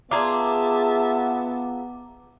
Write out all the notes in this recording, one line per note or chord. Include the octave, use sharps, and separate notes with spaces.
B3 F4 G#4 E5 A5 A#5 D6